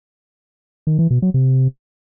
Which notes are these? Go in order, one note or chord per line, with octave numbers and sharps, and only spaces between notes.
D#3
E3
B2
F#3
C3